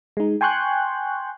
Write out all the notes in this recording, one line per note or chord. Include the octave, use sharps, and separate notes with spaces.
G#3 D#4
G5 G#5 C6 C#6 F#6 G6